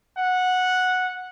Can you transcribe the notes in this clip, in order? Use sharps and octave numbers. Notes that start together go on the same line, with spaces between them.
F#5